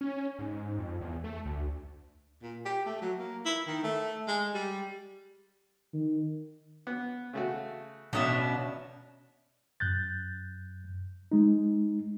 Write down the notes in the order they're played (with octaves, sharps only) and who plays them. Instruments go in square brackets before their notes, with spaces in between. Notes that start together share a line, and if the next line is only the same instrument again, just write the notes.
[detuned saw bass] C#4
G#2
F2
E2
A3
D2
[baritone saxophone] A#2
G4
A3
F#3
A#3
E4
D#3
A3
G#3
G3
[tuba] D#3
[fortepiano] B3
C#3 A3 F#4
[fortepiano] A1 D#6 [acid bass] B2 [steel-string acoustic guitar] C#4 D4 E5
[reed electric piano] F#2 F#6 G6 A6
G#3 D#4